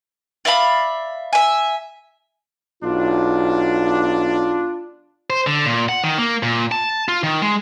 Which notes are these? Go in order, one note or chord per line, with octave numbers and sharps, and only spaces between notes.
D5 E5 F5 B5
E5 G#5
B1 D4 F4
C5
D3
A#2
F#5
D#3
A#3
A#2
A5
F4
D#3
G#3